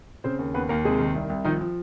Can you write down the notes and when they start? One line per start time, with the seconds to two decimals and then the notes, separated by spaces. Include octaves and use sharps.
0.24 C#3 C4 C5
0.39 D#2
0.54 D#2 B3 B4
0.69 D#2 A#3 A#4
0.85 C3 G#3 G#4
0.99 D#3
1.15 C2
1.30 C2
1.45 D#3 F3 D#4
1.61 F3